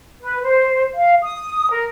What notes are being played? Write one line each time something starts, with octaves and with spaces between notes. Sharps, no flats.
B4
C5
F5
D#6
A#4